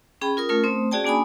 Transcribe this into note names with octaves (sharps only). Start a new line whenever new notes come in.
C#4 G#4 G5 B5
F4 A#4 D#6
A3 C#4 F4 A#4
A3 C4 C5 D#6
C#4 F#4 G#4 D5 G5 A5
A#3 D4 G#5 B5 D#6